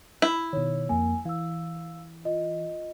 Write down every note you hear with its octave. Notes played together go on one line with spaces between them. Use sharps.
E4
B2 D#3 C#5
F2 A#3 G#5
E3 F5 E6
F4 D#5